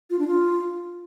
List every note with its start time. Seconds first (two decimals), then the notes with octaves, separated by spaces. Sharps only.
0.10 F4
0.19 D4
0.28 F4